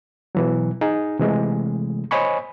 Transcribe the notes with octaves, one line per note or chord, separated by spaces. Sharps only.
B2 E3 F#3
D#4 G#4
C3 E3 G#3 A3
C5 C#5 D#5 G#5 B5 C#6